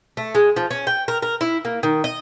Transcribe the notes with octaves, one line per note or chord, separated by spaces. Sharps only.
A3
G#3
F3
C#4
G5
A#4
A#4
E4
A#3
D#3
D#5